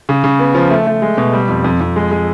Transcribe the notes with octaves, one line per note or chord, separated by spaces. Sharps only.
C#3
C#3
B3
F3
A3
A3
G#3
B2
G3
F2
F2
F2
G#3
G#3